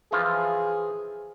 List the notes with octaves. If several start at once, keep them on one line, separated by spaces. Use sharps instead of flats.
E3 F3 F4 G#4